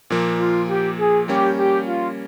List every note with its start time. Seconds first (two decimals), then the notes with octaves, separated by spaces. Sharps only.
0.10 A#2 F3 A#3
0.40 F4
0.69 G4
0.99 G#4
1.28 G3 A#3 C#4 G4
1.58 G4
1.87 F4